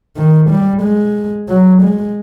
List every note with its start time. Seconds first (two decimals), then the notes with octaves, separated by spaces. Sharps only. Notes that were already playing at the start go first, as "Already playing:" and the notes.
0.18 D#3
0.50 G3
0.82 G#3
1.49 F#3
1.82 G#3